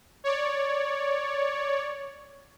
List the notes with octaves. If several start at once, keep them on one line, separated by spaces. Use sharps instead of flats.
C#5 D5